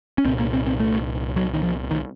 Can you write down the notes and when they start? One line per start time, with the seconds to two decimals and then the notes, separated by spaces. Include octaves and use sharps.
0.18 C#4
0.25 C2 A#2 C4
0.39 A#3
0.53 C4
0.66 C4
0.80 A3
1.36 F#3
1.53 D#3
1.63 F3
1.91 D#3